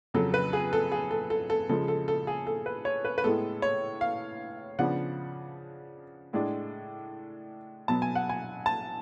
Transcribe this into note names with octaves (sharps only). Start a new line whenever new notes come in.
F2 C#3 F#3 A4
B4
G#4
A4
G#4
A4
A4
A4
C#3 F3 G#3 A4
A4
A4
G#4
A4
B4
C#5
B4
B4
A2 G#3 B3 A4
C#5
F5
C#3 F3 B3 D4 F#5
A2 G#3 D4
B2 F#3 B3 A5
G#5
F#5
G#5
A5